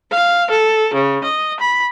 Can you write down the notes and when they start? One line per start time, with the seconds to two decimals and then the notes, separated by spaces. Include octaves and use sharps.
0.10 F5
0.50 A4
0.93 C#3
1.23 D#5
1.59 B5